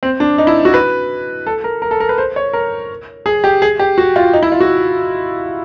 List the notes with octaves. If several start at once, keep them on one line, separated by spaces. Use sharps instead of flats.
C4
D4
D#4
E4
F#4
B4
A4
A#4
A#4
A4
A#4
B4
C5
C#5
A#4
G#4
G4
G#4
G4
F#4
F4
D#4
E4
F4
F#4